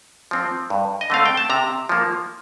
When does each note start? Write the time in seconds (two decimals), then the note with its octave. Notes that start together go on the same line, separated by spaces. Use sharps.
0.31 F3 C4
0.70 G2
1.01 D#5
1.10 D3 A3 C4 F5
1.26 G5
1.37 A5
1.50 C3 A#5
1.89 F3 A#3